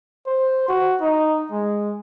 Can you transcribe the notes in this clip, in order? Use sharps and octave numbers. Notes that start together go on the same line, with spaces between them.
C5
F#4
D#4
G#3